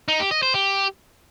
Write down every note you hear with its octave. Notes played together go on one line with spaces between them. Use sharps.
D#4
G4
D#5
C5
G4